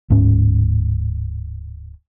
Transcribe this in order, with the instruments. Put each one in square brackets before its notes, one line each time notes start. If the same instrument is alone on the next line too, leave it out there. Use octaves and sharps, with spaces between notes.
[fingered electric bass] D1 G#2 C#4